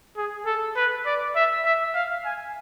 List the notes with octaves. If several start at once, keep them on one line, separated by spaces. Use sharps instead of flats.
G#4
A4
B4
D5
E5
E5
F5
G#5